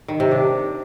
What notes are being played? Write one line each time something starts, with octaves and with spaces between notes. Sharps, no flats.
D#3
C3
D4